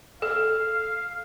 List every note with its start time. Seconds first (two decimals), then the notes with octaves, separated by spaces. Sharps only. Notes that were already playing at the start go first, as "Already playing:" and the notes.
0.22 A4 F5